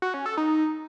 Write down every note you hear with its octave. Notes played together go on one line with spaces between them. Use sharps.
F#4
C#4
A4
D#4